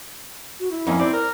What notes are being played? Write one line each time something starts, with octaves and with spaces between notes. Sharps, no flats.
F#4
E4
F2 A#3 C#4 D#4
C4 D5
A#4